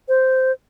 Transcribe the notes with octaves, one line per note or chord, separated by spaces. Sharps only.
C5